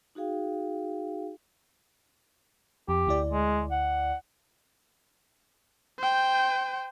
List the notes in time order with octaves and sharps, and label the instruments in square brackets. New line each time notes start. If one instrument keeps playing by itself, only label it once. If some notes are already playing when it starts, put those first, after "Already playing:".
[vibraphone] D#4 F#4 G#4 F5 G5
[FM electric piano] F2 [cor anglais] G4
[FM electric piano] D2 E4 D5
[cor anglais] G#3
F#5
[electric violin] C5 G5